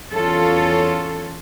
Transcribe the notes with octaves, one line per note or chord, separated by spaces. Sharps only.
E2 C#4 F4 A4 C#5